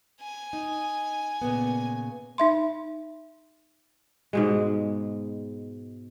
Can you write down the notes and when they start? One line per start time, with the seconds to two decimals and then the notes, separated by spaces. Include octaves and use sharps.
0.21 G#5
0.53 D#4
1.42 A#2 C#3 B3
2.38 D#4 E5 C6
4.33 G#2 B2 G#3